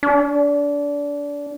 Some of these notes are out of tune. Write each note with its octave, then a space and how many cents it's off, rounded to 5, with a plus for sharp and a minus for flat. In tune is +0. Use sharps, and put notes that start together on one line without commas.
D4 -25